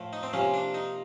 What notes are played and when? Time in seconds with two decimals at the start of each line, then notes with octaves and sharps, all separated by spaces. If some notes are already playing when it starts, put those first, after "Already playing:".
Already playing: A2 F3 A3
0.13 D#4
0.23 C4
0.33 C3 F3 A#3 C#4
0.54 D4
0.74 D#4